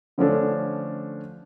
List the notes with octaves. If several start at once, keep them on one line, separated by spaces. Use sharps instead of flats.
D3 F3 A3 C#4 D4 A4